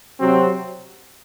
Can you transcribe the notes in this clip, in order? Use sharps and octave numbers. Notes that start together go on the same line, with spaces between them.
C3 F#3 C4 F#4